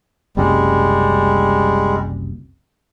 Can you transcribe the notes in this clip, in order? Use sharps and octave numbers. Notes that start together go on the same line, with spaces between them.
F#1 C2 F#2 G3 G#3